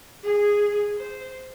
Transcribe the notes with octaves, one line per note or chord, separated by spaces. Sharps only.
G#4
C5